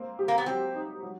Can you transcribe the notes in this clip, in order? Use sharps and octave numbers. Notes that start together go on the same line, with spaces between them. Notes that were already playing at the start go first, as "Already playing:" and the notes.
Already playing: A#3 C4
G4
A#3
B3
F#3 C4
D#4
F#3